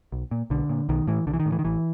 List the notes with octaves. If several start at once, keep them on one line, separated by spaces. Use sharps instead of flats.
B1
A#2
B1 D3
A#2
B1 D#3
A2 E3
B1 D3
E3
D#3
A2
E3
D#3
A1 E3